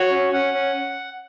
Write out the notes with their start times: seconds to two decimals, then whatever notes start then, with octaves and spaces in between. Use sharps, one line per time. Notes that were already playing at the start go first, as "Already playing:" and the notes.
Already playing: F#4 C#5
0.11 C#4
0.32 C#4 F#5
0.54 C#4